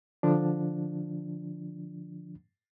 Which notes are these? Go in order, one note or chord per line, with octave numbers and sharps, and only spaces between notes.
D3 F3 D4